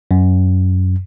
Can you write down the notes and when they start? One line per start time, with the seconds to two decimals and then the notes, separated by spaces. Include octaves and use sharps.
0.11 F#2